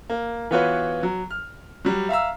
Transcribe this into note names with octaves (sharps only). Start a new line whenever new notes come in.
A#3
E3 B3 F4 F#4 B4 C#5
F#3
F6
F#3 G3
E5 F5 A#5 E6